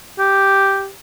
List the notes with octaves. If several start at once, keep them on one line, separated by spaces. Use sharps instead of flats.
G4